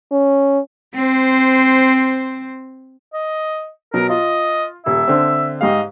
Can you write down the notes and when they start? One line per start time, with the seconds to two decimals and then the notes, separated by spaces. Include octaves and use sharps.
0.11 C#4
0.95 C4 C5
3.14 D#5
3.94 B2 F#3 A#4
4.09 F4 D#5
4.86 D#1 E5
5.08 D3 C4
5.61 G#2 G4 D#5 F5